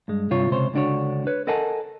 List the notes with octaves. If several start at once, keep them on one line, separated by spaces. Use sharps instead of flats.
G2 G#3
G2 C3 F4 C#5
C#2 C3 C5 C#5
C#2 D3 D4 F#4 C#5
B4 C#5
A4 A#4 D#5 F#5 G#5 A5